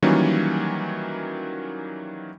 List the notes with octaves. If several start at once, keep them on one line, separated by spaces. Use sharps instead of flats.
D#3 E3 F#3 G3 A#3 C#4